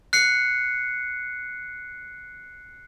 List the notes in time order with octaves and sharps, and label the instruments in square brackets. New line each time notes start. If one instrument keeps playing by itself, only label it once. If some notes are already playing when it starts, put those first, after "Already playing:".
[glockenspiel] F#6 C7 C#7